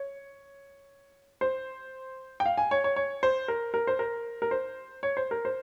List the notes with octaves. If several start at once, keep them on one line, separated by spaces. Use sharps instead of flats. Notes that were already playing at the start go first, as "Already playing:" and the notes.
Already playing: C#5
C5
G5
F5
G#5
C#5
C#5
C#5
C5
A#4
A#4
C5
A#4
A#4
C5
C#5
C5
A#4
C5